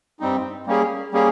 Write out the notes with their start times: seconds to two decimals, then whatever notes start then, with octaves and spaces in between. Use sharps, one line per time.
0.20 G2 G3 C4 D#4
0.67 G3 A#3 C#4 G#4
1.12 G3 A#3 C#4 G#4